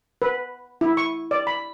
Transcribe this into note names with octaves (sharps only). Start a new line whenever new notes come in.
B4
E4
C#6
D5
B5